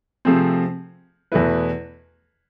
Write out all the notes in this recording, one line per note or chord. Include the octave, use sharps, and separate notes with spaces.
C3 F3 A3 C4 G#4
E2 B2 A3 E4 B4